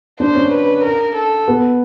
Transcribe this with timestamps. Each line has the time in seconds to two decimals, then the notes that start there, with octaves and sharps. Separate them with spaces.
0.20 D4 C5
0.36 C#4
0.52 B4
0.84 A#4
1.15 A4
1.48 B3